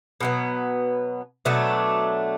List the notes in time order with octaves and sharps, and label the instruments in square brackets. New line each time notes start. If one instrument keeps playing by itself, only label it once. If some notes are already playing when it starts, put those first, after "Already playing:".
[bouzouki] B2 F#3 B3
B2 F#3 A3 D4